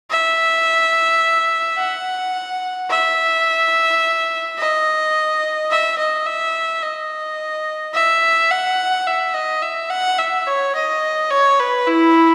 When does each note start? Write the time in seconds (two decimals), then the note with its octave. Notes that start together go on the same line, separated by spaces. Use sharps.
0.10 E5
1.78 F#5
2.90 E5
4.58 D#5
5.70 E5
5.98 D#5
6.26 E5
6.82 D#5
7.95 E5
8.51 F#5
9.07 E5
9.34 D#5
9.62 E5
9.90 F#5
10.19 E5
10.47 C#5
10.75 D#5
11.30 C#5
11.59 B4
11.87 E4